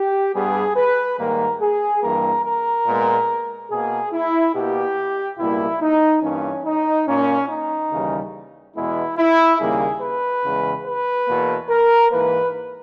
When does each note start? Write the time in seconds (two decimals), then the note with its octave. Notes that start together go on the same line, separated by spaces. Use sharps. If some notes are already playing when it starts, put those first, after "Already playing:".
Already playing: G4
0.35 G2 G3 B3 G#4
0.77 B4
1.19 G#2 D#3 G3 A#3 A#4
1.62 G#4
2.03 G2 E3 G3 A#3 A#4
2.46 A#4
2.87 A#2 G#3 B3
3.71 B2 A#3 G#4
4.13 E4
4.55 B2 A#3 G4
5.39 C#2 B2 G3 A#3 E4
5.82 D#4
6.23 G2 E3 A#3 C#4
6.65 D#4
7.08 A#2 A#3 C#4
7.50 D#4
7.92 D#2 C#3 E3 G3
8.75 E2 B2 G#3 B3 E4
9.18 E4
9.60 D#2 C#3 G3 A#3 G#4
10.02 B4
10.44 E2 C#3 G#3
10.86 B4
11.28 E2 B2 A#3
11.70 A#4
12.11 G#2 E3 A#3 B4